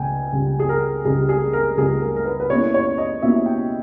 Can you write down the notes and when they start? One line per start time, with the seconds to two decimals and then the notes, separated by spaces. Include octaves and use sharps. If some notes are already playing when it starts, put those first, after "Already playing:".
Already playing: C#2 C#3 G5 G#5
0.32 C#2 C#3 G3
0.59 G#4
0.69 A#4
1.05 C#2 C#3 G3 G#4
1.29 G#4
1.53 A#4
1.77 C#2 C#3 G3 G#4
2.02 A#4
2.16 A#4
2.25 B4
2.40 B4
2.50 B2 A#3 C#4 E4 C#5
2.74 C#5
2.98 D#5
3.22 B2 A#3 C#4 E4 E5
3.46 G5